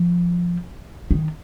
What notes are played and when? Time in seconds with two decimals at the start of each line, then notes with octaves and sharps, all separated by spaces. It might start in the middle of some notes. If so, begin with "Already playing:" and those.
Already playing: F3
1.11 D#3